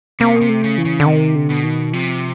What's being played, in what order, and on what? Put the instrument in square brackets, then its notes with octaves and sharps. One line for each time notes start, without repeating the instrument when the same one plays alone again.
[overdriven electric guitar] C3 [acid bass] A#3
[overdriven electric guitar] B2
C3
[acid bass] A3
[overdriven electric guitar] C#3
[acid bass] E3
[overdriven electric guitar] C#3
[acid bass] D3
[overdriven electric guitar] C3 [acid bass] D#3
[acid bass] D3
[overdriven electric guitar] B2
[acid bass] D#3
[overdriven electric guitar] C3 [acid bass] F3